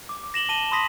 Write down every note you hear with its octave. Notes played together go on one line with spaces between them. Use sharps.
D6
A#6 E7 F#7 G7
A5 A#6 D#7 G7
B5 C6 D#6 A#6 B6 F#7